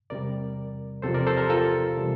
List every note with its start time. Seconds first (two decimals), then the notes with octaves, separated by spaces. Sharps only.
0.10 E2 C3 G3 A#4 D5
1.02 E2 C3 F3 A4 C5
1.14 A#4 D5
1.27 A4 C5
1.37 G4 A#4
1.50 F4 A4
1.97 C3 E3 G3